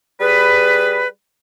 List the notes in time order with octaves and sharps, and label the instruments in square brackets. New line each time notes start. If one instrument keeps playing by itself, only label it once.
[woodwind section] G3 G#4 B4